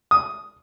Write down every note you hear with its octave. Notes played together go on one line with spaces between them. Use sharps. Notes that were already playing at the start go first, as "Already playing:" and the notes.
D#6